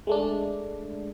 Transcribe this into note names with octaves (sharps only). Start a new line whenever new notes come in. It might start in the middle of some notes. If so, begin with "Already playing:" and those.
G#3 A3 D4